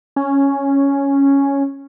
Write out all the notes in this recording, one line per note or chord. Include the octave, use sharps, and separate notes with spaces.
C#4